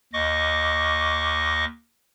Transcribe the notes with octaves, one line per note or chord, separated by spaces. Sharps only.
D#2 D#5 C#6 D6